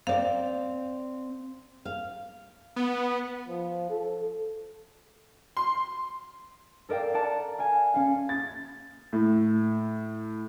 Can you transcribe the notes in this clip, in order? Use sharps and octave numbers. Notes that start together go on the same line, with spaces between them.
C4 D5 F5
F5
B3
F3
A4
C6
A4 A#4 D5 F5 G5
D5 F#5 A5 A#5
F5 G#5 A5
C#4 F5
A6
A2